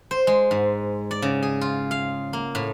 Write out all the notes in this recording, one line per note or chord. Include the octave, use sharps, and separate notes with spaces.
C5
G#3
G#2
D5
C#3
G#4
F4
F5
A#3
A2